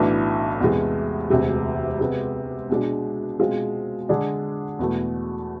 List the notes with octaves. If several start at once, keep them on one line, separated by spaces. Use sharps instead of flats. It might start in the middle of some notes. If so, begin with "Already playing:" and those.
Already playing: B1 A2 E3 A3 D4
E2 C3 G#3
E1 D2 C3 G#3
C3 G#3 B3
B2 G#3 D4
B2 G#3 C4 F4
D3 G#3 D4 G#4 D5
E2 B2 A3